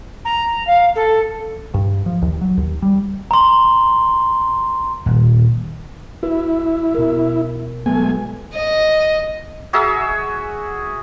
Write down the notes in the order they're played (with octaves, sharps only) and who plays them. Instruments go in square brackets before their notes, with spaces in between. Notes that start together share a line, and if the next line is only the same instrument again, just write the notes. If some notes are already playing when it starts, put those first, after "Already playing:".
[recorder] A#5
F5
A4
[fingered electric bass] G2
F3
D#2
F#3
D#2
G3
[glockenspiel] A#5 C6
[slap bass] D#1
[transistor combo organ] E4 [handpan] F#4 B4
[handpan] B2 A#4
[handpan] F#3 G#3 B3 [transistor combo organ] A3 G#5
[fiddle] D#5
[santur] F#4 G#4 A#4 E5